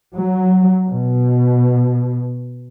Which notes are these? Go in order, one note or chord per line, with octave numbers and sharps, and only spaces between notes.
F#3
B2